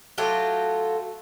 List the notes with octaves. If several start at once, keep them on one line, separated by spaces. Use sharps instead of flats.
F#3 A3 F4 G4